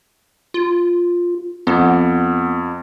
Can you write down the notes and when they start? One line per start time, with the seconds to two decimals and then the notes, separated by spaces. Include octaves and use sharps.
0.54 F4
1.67 F2 B3